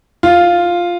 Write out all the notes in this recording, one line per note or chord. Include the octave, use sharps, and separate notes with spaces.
F4